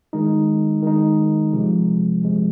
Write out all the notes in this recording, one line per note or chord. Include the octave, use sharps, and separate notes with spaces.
D#3 G#3 D#4
D#3 G#3 D#4
C3 F3 G#3
C3 F3 G#3